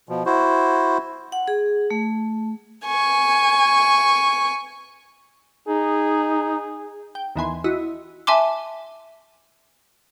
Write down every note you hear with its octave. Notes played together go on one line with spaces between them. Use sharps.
B2 F3
E4 F#4 C5
F#5
G#4
A3
G#5 C#6
D#4 G#4
G5
D#2 D#3 E3 B3 G#5 C6
E4 F#4 D#5
E5 G#5 A5 C6 D6